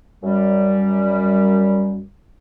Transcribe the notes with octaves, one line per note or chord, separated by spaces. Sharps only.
F#2 G3